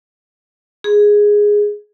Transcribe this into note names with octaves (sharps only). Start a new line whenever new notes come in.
G#4